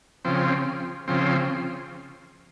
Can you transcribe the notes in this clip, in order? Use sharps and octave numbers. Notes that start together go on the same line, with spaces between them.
C#3 F3 C4
C#3 F3 C4